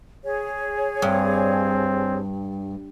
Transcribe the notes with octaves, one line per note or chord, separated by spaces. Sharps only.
G#4 C#5
G2 C4